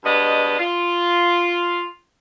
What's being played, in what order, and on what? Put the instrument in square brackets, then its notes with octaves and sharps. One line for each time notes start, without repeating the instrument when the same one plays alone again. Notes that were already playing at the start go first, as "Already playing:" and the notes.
[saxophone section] G2 G#3 B3 D5 D#5
F4